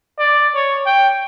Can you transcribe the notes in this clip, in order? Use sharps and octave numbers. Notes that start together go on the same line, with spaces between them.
D5
C#5
G5